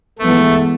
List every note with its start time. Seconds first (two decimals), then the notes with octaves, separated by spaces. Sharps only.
0.19 E3 G#3 A3 B3